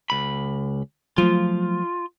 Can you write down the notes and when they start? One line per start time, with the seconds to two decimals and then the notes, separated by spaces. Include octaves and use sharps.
0.10 C#2 B5
1.18 F3 F#3 A3 F4